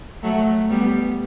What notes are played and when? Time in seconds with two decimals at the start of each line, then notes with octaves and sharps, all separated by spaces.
0.23 F#3 A3
0.69 G3 B3